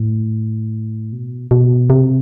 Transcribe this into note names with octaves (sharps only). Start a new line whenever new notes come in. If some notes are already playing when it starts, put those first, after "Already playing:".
Already playing: A2
B2
B2
C3